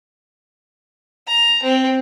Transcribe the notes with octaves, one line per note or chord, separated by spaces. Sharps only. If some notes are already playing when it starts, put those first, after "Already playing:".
A#5
C4